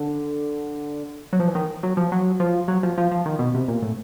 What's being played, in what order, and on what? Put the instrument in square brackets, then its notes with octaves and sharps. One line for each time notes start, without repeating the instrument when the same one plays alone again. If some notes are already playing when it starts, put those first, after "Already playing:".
Already playing: [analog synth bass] D3
F#3
F3
E3
D#3
F#3
F3
F#3
F3
F#3
F3
F3
F3
D#3
B2
C3
A#2
A2